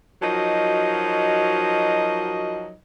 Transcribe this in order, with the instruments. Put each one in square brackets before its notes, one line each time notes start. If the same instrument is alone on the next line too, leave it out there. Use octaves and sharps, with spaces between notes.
[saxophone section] F3 F#3 D#4 F#4 A#4 D#5